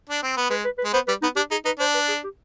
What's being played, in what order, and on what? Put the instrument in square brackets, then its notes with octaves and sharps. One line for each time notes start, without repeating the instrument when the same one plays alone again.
[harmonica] D4
C4
B3
[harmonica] G#3 [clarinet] B4
[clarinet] B4
B4
[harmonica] G#3
[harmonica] B3 [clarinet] C5
[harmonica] G3 [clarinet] B4
[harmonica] B3 [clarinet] D#4
[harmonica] D4 [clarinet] G4
[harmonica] D#4 [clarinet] G#4
[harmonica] D#4 [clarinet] B4
[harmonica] D4 [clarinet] C5
[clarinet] B4
G#4
G4